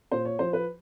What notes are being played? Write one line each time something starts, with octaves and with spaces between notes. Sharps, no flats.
A#2 C5
C#5
F3 C5
B4